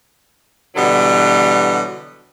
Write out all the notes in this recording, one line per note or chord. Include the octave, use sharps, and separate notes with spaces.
B2 D3 E3 F#3 G3